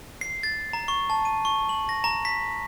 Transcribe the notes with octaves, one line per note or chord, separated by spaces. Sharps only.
C7
A6
A#5
C#6
A5
D#7
C#6
F#7
A#6
A#5
B6